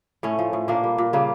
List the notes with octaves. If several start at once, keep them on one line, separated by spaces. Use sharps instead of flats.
A2 A3 C#4
F3
A2
A#2 A#3 D4
G3
A#2
C#3 G3 A#3